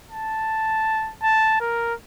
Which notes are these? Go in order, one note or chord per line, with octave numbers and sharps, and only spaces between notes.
A5
A5
A#4